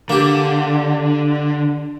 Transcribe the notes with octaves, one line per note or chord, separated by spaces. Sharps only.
D3 A#3 G4